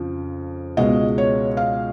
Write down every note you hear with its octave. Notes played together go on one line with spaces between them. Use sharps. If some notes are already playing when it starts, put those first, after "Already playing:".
Already playing: F2 C#3 F3
C#2 B2 G#3 D#5
C#5
F5